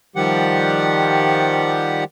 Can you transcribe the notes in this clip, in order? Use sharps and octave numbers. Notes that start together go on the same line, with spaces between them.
D#3 F3 G3 G4 F#5